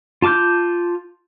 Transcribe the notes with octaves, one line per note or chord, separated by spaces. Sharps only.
F4 A5 D6 F6 G6